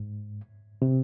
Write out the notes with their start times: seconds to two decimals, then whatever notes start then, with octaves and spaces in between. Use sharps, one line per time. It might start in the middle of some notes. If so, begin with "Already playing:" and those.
Already playing: G#2
0.82 C3